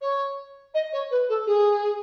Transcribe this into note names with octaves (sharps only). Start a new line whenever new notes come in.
C#5
D#5
C#5
B4
A4
G#4